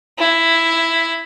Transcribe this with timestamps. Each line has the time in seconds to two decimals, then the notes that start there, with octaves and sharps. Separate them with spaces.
0.19 E4